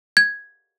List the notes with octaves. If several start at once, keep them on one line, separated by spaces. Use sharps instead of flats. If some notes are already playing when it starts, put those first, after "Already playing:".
G#6